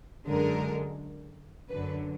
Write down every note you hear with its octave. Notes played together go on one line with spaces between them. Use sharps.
F#2 D3 G#3 A#4
F#2 D3 F#3 B4